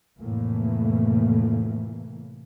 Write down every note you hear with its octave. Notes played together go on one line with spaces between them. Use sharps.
F1 A2 E3 A3 A#3